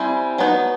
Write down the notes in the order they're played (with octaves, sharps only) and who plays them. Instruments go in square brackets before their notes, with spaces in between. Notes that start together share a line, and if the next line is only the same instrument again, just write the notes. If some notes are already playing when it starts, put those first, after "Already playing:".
Already playing: [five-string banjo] G3 C4 E4 [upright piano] G#5
[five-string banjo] F#3 B3 D#4